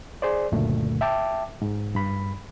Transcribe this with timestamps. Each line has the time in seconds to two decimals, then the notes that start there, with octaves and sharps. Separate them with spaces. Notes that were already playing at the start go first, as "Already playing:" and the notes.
0.22 G#4 C5 D5
0.52 C#2 F#2 A#2 D3 A3
1.01 E5 G5 A5 D6
1.62 G#2
1.95 G2 B5